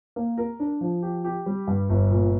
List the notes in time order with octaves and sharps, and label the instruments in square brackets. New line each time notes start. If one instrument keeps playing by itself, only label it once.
[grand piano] A#3
A#4
D4
F3
G4
G4
G3
G2
G1
A#2